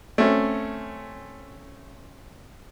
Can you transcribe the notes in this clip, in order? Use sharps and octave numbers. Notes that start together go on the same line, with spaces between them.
A3 C4 C#4